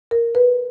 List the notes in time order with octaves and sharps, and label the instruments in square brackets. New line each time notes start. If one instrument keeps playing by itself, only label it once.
[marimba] A#4
B4